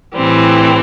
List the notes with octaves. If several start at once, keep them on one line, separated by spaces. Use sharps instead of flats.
A2 E3 G3 C4